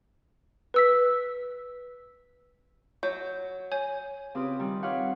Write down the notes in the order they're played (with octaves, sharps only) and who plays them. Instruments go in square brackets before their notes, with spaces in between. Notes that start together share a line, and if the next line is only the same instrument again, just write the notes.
[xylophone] B4 E6 B6
[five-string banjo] F#3 [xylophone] G6
[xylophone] C#5 G#5 G6
[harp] C#3 C4 F4 G4 B4 D#6
D#3 G3 G4
F4 G4 B4 C#5 F5 F#5